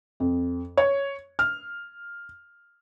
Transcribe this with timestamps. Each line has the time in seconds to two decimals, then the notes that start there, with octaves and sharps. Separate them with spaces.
0.20 F2
0.77 C#5
1.39 F6